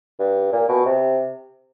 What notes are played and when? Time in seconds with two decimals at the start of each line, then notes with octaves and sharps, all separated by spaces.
0.19 G2
0.52 A#2
0.69 B2
0.85 C3